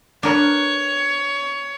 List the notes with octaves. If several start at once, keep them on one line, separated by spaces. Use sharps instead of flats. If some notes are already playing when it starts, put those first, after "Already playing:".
D4 A#4 B4 C#5